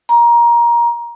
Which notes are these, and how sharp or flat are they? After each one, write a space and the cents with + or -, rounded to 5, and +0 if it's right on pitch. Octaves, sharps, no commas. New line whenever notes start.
A#5 +20